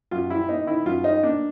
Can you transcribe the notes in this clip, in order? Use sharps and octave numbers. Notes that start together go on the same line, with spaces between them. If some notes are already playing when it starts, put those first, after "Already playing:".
F#2 F4
G3 E4
A#3 D#4
D#3 E4
F#2 F4
G3 D#4
A#3 D4